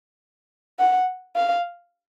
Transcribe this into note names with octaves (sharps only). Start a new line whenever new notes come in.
F#5
F5